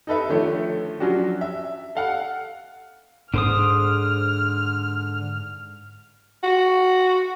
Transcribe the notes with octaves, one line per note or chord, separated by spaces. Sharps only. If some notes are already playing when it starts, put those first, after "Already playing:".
D#4 A4 B4 E5
D3 D#3 F3 A3 C#5
F3 F#3 C#4 D4 F#4
E5
A4 F5 F#5
G#2 D3 C5 D#6 F6
F#4